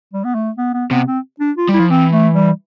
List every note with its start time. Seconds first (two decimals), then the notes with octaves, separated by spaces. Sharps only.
0.14 G3
0.25 B3
0.35 A3
0.58 B3
0.74 B3
0.91 C3 B3
1.08 C4
1.40 D4
1.57 F4
1.69 G3
1.74 E4
1.79 F3
1.90 E3 C4
2.13 A3
2.35 G3